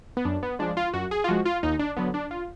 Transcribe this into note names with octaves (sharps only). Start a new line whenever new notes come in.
B3
F#2 D4
B3
F3 G#3 D4
F4
F#2 F#4
G#4
F4
F3 G#3 F#4
F4
D#2 D#4
D4
D3 F#3 B3
D4
F4